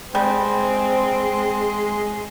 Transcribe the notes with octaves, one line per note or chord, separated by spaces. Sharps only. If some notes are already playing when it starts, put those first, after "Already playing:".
G3 G#3 C4